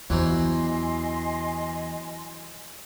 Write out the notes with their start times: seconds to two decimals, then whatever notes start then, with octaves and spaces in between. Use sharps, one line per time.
0.10 E2 E3 F#3 C5 D#5 G#5 C6